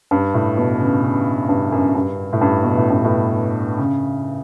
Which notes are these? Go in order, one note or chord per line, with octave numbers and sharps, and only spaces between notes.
G2
A2
B2
C#3
C#3
G2
F#2
G2
A2
G2
B2
A2
G2
A2
C#3